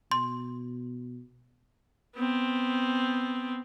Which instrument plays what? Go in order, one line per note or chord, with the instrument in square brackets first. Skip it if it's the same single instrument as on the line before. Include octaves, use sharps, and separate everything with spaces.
[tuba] B2 [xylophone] C6
[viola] B3 C4